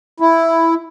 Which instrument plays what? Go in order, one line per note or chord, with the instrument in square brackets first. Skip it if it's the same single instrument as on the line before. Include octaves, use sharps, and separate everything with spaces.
[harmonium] E4